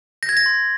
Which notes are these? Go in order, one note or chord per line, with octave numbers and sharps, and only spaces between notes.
G6 A#6
G#6
A#6
C6